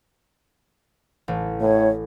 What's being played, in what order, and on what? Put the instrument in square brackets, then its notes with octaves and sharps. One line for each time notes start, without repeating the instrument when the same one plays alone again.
[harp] A1
[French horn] A2 [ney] C#5